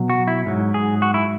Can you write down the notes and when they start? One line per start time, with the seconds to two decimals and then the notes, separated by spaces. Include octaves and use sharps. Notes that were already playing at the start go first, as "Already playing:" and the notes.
Already playing: B2 F#3
0.10 F#4
0.28 E4
0.46 G#2 F#3
0.74 G#4
1.02 F#4
1.14 E4